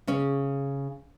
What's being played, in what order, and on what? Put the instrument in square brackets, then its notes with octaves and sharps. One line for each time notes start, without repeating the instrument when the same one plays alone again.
[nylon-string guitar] C#3 C#4